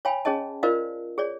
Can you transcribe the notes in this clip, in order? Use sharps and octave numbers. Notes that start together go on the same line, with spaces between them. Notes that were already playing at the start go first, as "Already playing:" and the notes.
C#5 F5 G5 G#5 B5
C#4 G#4 C#5 D#5 A5
F4 A#4 C5 D5 D#5 F5
G#4 C#5 D5